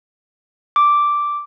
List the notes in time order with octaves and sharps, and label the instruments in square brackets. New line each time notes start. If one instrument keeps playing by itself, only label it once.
[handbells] D6